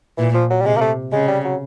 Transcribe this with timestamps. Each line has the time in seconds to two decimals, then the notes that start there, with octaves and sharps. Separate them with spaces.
0.18 A#2 E3
0.34 F3
0.50 F#3
0.60 G3
0.65 C3 G#3
0.77 A#3
0.81 A3
1.12 C#3 G#3
1.28 G3
1.44 F#3